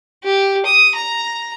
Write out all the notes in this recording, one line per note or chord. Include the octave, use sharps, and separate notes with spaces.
G4
D#6
A#5